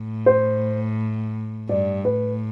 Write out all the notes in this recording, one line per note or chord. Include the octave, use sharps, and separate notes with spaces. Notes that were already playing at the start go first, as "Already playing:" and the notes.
Already playing: A2
C5
G2 D5
A2 B4